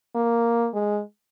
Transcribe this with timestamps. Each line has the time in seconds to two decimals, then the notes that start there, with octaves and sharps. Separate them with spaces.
0.15 A#3
0.74 G#3